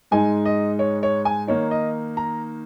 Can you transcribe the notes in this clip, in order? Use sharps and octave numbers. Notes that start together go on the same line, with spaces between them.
G#2 G#3 D#4 G#5
D#5
C#5
C#5
G#5
D#3 A#3 D#4 C#5
D#5
A#5